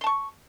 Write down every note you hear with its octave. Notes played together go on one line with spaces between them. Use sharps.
A5 C6 C#6